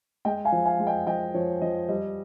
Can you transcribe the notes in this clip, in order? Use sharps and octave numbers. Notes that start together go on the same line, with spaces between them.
G#3 D#5 G5
F5 G#5
F3
F5 G#5
G#3
D#5 G5
F3 D#5 G5
F3 C#5
F3 D#5
G3 D#5